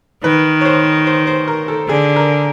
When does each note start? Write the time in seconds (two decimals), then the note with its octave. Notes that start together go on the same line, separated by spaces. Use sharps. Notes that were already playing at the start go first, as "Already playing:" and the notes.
0.24 D#3 B4
0.61 C#5
0.65 C5
1.07 C5
1.27 C5
1.48 A#4
1.68 A4
1.89 D3 G#4
2.16 A#4